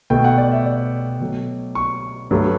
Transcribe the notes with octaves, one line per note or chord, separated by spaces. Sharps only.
B2 A3 G5
F#5
D5
E5
D5
B2 F#3 A3
C#6
G2 F#3 A3